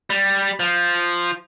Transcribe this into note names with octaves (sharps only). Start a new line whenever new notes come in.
G3
F3